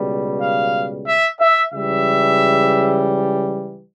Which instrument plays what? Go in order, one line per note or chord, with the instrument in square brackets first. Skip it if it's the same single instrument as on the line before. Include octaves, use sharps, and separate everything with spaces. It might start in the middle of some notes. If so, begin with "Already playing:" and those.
Already playing: [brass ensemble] C#2 B2 G3
F5
E5
E5
C#2 C#3 E3 G3 E5